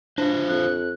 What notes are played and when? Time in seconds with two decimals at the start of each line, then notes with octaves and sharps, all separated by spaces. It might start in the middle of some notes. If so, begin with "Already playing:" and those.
0.18 D4 F4 B4 C5
0.49 F2 F#6